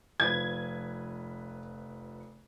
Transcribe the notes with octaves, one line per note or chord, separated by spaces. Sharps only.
F1 F3 B4 G#6